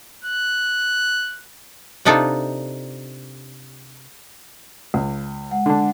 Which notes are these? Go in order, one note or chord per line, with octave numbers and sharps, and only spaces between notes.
F#6
C3 D4 D#4 F4 A4
C#2
G#3 F#5
D3 D4